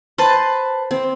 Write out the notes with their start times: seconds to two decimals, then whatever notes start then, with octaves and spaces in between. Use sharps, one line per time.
0.18 B4 C5 A5
0.91 C4